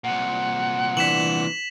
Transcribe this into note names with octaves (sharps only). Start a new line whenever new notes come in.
C2 A#2 F#5
E3 D4 B6 E7 F#7